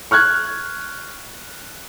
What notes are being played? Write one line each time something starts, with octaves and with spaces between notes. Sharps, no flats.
C#6 F6 F#6 G#6